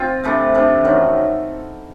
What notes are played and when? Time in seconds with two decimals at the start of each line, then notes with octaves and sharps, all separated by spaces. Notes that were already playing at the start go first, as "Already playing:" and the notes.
Already playing: C4 F4
0.24 C3 E3 A3 D4
0.54 C3 E3 A3 D4
0.84 F#2 D#3 F#3